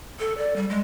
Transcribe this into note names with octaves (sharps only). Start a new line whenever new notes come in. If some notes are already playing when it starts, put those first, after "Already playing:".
A4
D5
G3
G#3